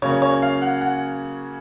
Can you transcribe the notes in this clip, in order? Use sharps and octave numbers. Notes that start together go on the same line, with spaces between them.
C#3 F#3 A#3 C#4 C#5
C#5
F5
F#5
F#5